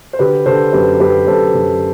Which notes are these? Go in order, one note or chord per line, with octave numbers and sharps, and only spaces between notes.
C5
D3 G4 B4
D3 A4 C5
F#2 G4 B4
F#2 G4 B4
F#2 A4 C5
F#2